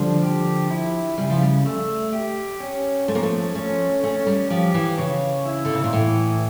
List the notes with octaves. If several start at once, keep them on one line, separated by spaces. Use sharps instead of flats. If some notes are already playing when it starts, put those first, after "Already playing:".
Already playing: D3 F3 G3
G4
E4
C#3 G3
F3
G3
A3
G4
C#4
F3 A3
A#3
A3
A3 C#4
A3 C#4
G3
F3 G4
E3
C#3 C#5
E4
D3
C#3
A#2
A2 E3